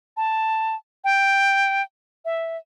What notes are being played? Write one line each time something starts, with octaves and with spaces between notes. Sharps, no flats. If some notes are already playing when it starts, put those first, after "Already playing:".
A5
G5
E5